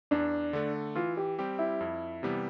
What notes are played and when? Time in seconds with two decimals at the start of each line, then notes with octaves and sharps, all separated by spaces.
0.11 E2 D4
0.53 D3 A3
0.96 E3 F4
1.17 G4
1.39 G3 C4 G4
1.59 E4
1.81 F2
2.23 C3 E3 G3 B3